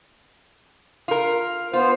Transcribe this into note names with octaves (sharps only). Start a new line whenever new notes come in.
F4 A#4
B3 F4 C5